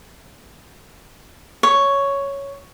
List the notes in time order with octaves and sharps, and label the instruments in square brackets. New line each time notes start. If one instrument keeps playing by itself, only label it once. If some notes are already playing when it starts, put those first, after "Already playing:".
[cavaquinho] C#5